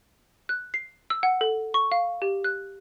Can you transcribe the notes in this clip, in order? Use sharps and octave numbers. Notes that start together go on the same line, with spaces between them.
F#6
C7
E6
F#5
A4
C#6
F5
G4
F#6